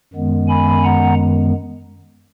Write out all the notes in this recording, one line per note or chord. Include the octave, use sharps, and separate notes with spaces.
F#2 D#3 G#3 B3
G#5 B5
F#5 A#5